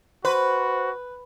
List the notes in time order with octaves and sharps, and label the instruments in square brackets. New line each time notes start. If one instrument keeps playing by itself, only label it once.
[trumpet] F#4 [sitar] B4 [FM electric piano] C5